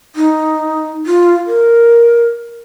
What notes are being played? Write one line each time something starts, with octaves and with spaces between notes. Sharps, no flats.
D#4
F4
A#4